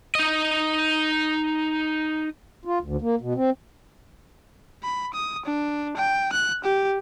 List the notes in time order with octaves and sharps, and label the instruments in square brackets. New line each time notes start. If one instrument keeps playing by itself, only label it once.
[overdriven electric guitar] D#4 D#5
[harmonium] F4
D2
A#3
B2
C4
[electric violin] B5
D#6
D4
G5
F#6
G4